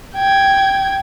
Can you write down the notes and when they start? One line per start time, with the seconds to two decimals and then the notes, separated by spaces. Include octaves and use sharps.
0.15 G5 G#6